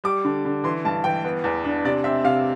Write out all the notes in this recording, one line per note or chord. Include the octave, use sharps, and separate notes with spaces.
G3 D6
D3
D3
E3 C6
G2 A5
E3 G5
B3
E2
D4
C3 D5
C4 E5
C3 F5